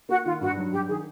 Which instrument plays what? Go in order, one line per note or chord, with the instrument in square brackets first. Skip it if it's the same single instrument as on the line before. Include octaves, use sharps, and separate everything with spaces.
[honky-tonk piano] A#3 [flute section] F#4
[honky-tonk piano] D#3 [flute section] F4
[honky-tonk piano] G2 [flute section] F#4
[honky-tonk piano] F#3
[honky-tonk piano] G2 [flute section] G4
[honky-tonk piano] D#3 [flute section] G#4